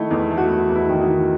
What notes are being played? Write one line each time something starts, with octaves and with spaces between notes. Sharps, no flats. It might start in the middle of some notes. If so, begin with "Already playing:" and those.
Already playing: D#3 A3 D#4 E4
E2 D#4
A3
F#4
E2 E4
E2
E4
D#3
D#4 F#4
D#3